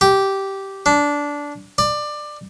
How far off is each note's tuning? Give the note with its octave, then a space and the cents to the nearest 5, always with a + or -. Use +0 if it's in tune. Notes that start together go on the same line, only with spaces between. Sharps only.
G4 -10
D4 -15
D5 +20